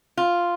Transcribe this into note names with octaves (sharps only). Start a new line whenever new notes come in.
F4